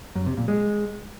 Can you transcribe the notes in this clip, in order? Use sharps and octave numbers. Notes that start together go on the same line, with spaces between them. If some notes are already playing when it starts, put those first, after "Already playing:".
F#2
C3
A#2
G#3